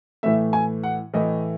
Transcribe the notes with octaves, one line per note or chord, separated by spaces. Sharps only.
A2 E3 A3 E5
G#5
F#5
A2 E3 A3 D#5